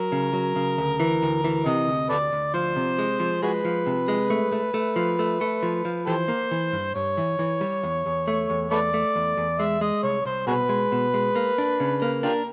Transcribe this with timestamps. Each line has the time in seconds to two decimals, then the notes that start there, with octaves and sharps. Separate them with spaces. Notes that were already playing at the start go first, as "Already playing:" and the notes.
Already playing: F#3 A#4
0.12 C#3
0.33 F#3
0.56 C#3
0.78 D2
1.00 E3
1.22 D2
1.44 E3
1.66 C3 D#5
1.88 D2
2.09 D2 A4 B4 D5
2.33 D2
2.54 F3 C5
2.76 C3
2.98 G#3
3.20 F3
3.43 G#3 F#4 G#4 B4
3.65 F3
3.86 C3
4.08 G#3
4.30 A3
4.52 A3
4.74 A3
4.96 F3
5.19 A3
5.41 A3
5.63 F3
5.85 F3
6.07 E3 G4 A4 C5
6.28 A#3
6.51 E3
6.72 G2
6.95 G2 C#5
7.17 E3
7.39 E3
7.61 G3
7.83 E2
8.06 E2
8.28 A3
8.50 E2
8.71 A3 A4 B4 D5
8.94 A3
9.16 E2
9.37 E2
9.59 G#3 E5
9.81 G#3 D#5
10.03 C2 C#5
10.25 C2 C5
10.47 B2 F#4 G#4 B4
10.69 G#3
10.92 B2
11.14 G#3
11.35 A#3
11.58 D4
11.80 C#3
12.02 A#3
12.23 D4 F4 G4 A#4